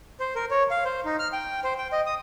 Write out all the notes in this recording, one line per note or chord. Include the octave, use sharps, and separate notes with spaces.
C5
A#4
C#5
F5
C5
D#4
F6
G5
C5
G5
D#5
D#6